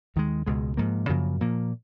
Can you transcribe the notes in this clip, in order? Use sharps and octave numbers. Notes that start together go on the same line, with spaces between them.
D#2 D#3 G#3
C#2 B2 G#3
G#2 F3 A#3
F#2 C#3 F3 A#3
A#2 F3 A#3